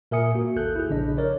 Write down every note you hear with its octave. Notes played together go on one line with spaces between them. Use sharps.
A#2 A#4 E5 G#5 D#6 C#7
A#3 F#4
A1 D#2 A4 F#6 G6
E4 G#4
A#1 C#3 D4 D#5
A#4 C#5 D5